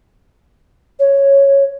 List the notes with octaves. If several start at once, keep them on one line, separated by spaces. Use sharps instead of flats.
C#5